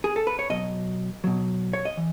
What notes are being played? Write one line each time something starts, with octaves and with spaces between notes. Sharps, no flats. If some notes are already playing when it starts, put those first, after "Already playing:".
G#4
A4
B4
C#5
B2 F#3 D#5
B2 F#3
C#5
D#5
E3